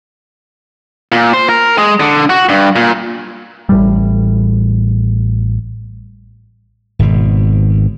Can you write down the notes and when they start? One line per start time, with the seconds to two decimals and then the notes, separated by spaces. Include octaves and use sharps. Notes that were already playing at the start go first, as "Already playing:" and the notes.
1.12 A#2
1.33 C5
1.49 A#4
1.78 G#3
2.00 D3
2.30 F#4
2.49 G2
2.76 A#2
3.69 A1 A2 G3
6.99 G#1 B2